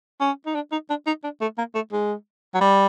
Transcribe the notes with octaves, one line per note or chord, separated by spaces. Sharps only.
C#4
D#4
D4
D#4
D4
D#4
D4
A3
A#3
A3
G#3
F#3
G3